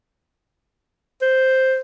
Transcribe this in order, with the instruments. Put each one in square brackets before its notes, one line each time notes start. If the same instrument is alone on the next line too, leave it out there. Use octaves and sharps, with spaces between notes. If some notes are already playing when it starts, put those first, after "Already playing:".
[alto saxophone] C5